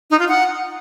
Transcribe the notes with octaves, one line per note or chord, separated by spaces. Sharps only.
D#4
F4
F#5